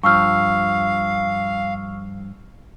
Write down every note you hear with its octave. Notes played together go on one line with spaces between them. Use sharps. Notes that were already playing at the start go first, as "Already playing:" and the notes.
G2 F3 F5 C#6 E6 F6